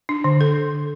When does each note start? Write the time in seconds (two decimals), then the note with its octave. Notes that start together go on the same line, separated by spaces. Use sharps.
0.09 D4
0.24 D3
0.41 A4